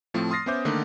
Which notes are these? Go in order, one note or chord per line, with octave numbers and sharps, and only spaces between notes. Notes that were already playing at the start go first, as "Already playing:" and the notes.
A2 F3 A3 C4
C6 D#6 F6 A6 A#6 C7
B3 C#4 C5 E5 D6 G6
D3 D#3 A3 A#3 D4